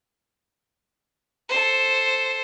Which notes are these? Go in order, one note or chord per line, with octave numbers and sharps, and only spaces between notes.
A4 C5